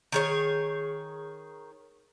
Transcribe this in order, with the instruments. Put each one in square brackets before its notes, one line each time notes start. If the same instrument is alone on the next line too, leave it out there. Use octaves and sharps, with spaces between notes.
[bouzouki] D#3 G#4 C#5